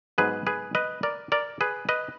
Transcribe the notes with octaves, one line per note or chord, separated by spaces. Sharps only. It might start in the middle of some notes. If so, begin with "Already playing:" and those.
G#2 F#3 B3 G#4 B4
G#4 B4
B4 D#5
A#4 D5
A#4 D5
G#4 B4
B4 D#5